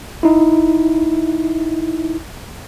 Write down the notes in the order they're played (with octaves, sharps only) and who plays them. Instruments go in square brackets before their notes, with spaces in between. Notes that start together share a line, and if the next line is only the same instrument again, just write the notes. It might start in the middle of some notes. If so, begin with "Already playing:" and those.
[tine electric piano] D#4 E4